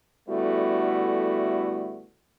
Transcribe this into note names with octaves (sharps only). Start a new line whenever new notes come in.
D3 G3 A3 B3 E4 F#4